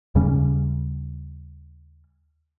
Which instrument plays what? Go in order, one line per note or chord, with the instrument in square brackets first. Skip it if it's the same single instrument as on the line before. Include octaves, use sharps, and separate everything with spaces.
[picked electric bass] D#2 C#3 G3 C#4